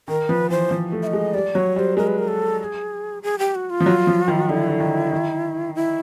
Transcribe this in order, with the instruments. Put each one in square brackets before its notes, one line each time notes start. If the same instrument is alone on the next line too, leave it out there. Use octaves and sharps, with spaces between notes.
[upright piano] D#3 [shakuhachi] A#4
[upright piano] F3 [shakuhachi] B4
[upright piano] E3 [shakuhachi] C5
[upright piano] F3
A3
[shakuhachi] E5
D#5
[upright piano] G#3
[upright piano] G3 [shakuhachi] D5
[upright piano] F#3 [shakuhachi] C#5
[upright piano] G3 [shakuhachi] C#5
[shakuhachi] C5
[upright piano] G#3 [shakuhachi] A#4
[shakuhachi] B4
A#4
A4
A4
G#4
G#4
G4
F#4
F4
[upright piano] F3
F#3
F3
D#3
[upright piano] D3 [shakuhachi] E4
[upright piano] D3
D#3
D#3
[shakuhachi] E4